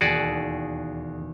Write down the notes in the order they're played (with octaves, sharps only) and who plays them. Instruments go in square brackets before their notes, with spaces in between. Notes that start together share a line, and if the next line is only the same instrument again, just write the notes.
[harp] E1 D#2 A6 [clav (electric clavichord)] F#4 G#4 D5